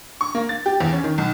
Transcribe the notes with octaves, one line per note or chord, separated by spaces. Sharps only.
C#6
A#3
A6
G4
E2
C#4
D#3
B1